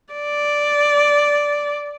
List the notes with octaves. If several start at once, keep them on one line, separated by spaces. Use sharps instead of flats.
D5